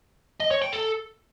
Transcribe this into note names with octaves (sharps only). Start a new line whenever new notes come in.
D#5
C#5
G5
A4